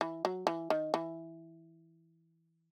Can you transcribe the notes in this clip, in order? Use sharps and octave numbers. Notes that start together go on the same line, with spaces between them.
E3
F#3
E3
D#3
E3